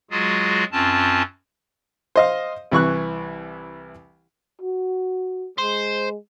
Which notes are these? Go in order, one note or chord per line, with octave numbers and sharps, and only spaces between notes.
F#3 G#3 F4 F#4 G#4
F#2 C4 C#4 F4 A5
C5 D#5 F5
C2 E3 C#6 F#6
F#4
G#3 C5